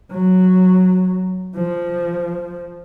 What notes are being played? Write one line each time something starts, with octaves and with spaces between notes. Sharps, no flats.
F#3
F3